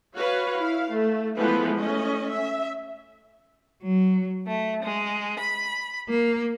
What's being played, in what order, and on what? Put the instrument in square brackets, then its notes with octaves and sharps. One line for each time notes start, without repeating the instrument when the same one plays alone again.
[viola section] F#4 B4 C#5 F5
E4 F5
A3
E3 F3 G#3 A3 B3 B4
A3 C#4 D#5
E5
[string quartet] F#3
A3
G#3
B5
A#3